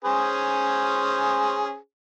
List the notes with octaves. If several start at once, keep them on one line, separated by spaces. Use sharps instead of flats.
C#4 G#4 C5